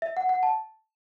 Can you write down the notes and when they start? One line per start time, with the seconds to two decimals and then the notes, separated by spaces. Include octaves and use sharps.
0.02 E5
0.17 F#5
0.29 F#5
0.43 A5